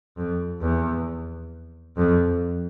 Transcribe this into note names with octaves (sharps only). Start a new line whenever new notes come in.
F2
E2
F2